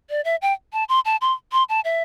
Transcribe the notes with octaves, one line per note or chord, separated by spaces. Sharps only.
D5
E5
G5
A5
C6
A5
C6
C6
A5
E5